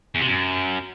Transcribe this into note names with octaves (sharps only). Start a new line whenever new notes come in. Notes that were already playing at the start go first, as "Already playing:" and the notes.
E2
C3
F#2